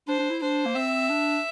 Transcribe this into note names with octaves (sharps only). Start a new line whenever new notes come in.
D4 C5
D4
E4
D4 C5
A#3
C4 E5
D4